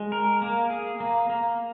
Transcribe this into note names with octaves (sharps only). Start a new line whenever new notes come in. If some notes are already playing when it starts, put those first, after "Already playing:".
Already playing: G#3
A#4
A#3
G#4
A#3
A#3